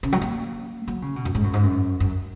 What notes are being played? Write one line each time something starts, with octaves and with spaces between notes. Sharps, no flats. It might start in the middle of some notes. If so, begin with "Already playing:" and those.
C#3
F#3
A#3
F#3
C#3
B2
F#2
G#2
F#2
G#2
F#2
F#2